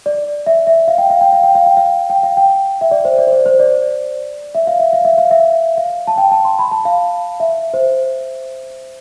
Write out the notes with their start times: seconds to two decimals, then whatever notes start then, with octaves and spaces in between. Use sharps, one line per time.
0.06 D5
0.46 E5
0.67 E5
0.88 F5
0.98 G5
1.10 F5
1.21 G5
1.33 F5
1.43 G5
1.55 F5
1.66 G5
1.77 F5
2.10 G5
2.23 F5
2.37 G5
2.81 E5
2.91 D5
3.05 C5
3.18 D5
3.27 C5
3.32 D5
3.46 C5
3.59 D5
4.55 E5
4.67 F5
4.80 E5
4.93 F5
5.05 E5
5.18 F5
5.31 E5
5.77 F5
6.07 A5
6.18 G5
6.31 A5
6.45 C6
6.59 B5
6.71 A5
6.85 F5
7.40 E5
7.74 C5